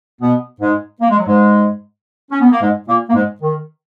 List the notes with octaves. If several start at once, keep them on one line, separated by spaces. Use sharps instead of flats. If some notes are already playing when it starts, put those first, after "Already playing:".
B2 B3
G#2 G#3
A#3
G#3
F#3
G#2 G#3
C#4
B3
A#3
G#2 G#3
A#2 A#3
A#3
G#2 G#3
D#3